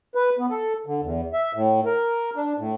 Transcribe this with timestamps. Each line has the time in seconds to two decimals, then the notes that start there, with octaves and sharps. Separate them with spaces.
0.15 B4
0.39 B3
0.50 A4
0.86 D3
1.03 E2
1.33 E5
1.54 A2
1.86 A#4
2.36 D4
2.58 A2